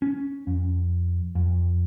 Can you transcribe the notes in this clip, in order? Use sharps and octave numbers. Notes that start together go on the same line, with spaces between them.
C#4
F2
F2